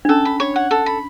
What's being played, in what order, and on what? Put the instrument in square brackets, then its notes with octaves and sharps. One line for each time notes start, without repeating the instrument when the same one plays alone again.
[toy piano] D4
[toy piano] C#4 [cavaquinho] A4
[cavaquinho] B5
C#5
F#5
A4
B5